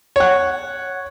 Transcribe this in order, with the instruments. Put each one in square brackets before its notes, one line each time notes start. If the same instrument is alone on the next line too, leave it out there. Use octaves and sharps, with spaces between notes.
[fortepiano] C#5 F#5